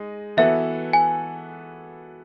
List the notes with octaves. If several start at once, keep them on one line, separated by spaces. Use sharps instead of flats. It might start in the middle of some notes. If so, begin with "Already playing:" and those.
Already playing: G#3 D#4
E3 B3 F#4 A4 E5
G#5